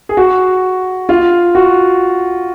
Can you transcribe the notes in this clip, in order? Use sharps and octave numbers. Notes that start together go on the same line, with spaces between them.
G#4
F#4
F4
F#4